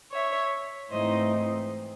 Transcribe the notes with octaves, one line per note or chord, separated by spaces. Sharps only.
C#5 E5
G#2 E3 A3 C4 D#4 C5 D#5